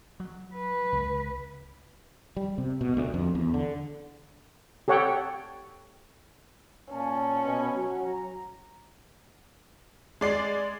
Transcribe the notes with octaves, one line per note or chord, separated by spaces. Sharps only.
F#3
B4
C#2
G3
C3
B2
D2
F2
E2
D3
G4 A4 C#5 F#5 G5
A#2 C#4 A5
B2
F#3
A#5
G#3 D5 C7